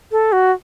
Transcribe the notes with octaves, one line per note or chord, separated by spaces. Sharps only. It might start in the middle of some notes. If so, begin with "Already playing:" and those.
A4
F#4